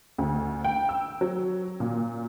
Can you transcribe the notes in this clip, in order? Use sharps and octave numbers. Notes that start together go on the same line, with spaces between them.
D2
G5
E6
F#3
A#2